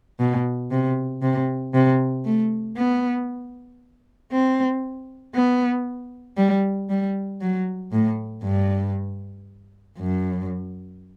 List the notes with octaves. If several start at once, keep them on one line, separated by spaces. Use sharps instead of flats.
B2
C3
C3
C3
A3
B3
C4
B3
G3
G3
F#3
A2
G2
F#2